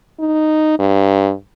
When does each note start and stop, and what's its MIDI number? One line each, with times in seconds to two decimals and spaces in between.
0.20 0.79 63
0.79 1.32 43